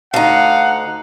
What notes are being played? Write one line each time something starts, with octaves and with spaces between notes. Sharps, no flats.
D2 D#4 F5 F#5